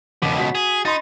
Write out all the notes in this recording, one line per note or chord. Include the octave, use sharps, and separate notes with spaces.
E1 C#2 B2 D6
F#4 B6
G#4
D#4 B5 C6 A6